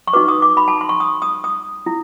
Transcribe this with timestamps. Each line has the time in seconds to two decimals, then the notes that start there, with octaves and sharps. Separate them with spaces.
0.07 C#6
0.13 D#4 F#4 B4 D6
0.28 D#6
0.42 D6
0.57 B5
0.68 A5
0.81 C6
0.89 C#6
1.00 D#6
1.22 D#6
1.44 D#6
1.86 E4